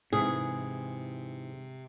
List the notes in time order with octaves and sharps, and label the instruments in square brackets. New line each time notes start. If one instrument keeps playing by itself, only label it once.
[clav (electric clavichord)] G#2 E3 [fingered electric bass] C3 [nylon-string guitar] G#4